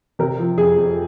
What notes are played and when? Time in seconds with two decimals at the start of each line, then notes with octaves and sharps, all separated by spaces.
0.19 C3 A#4
0.38 F3
0.57 F2 G#4
0.77 F2